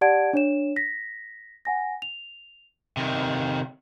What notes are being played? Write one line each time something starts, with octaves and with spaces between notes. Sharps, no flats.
G4 D5 F#5 A5 G#6 D7
D4 C#5 E7
A#6 B6
F#5 G#5 A#6
F7
C3 D#3